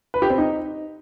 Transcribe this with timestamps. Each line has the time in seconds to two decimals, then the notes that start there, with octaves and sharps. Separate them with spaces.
0.14 B4
0.22 G4
0.30 C4
0.38 D#4